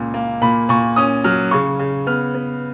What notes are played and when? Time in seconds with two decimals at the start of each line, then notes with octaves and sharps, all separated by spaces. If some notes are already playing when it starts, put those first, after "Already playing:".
Already playing: C#2 A#2
0.14 A#3
0.42 A#2 B5
0.69 A#2 C#6
0.96 C#4 D#6
1.24 F#3 F6
1.51 C#3 C#6
1.79 C#3
2.07 B3 F6
2.34 B3